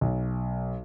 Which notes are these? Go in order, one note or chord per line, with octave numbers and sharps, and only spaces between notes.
B1